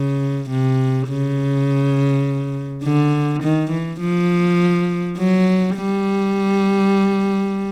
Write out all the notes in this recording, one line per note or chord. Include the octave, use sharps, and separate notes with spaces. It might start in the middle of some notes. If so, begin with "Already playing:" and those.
Already playing: C#3
C3
C#3
D3
D#3
E3
F3
F#3
G3